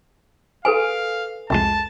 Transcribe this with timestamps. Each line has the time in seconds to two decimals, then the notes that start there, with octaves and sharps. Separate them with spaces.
0.65 A4 B4 F5 G#5
1.50 C2 F2 G#3 A5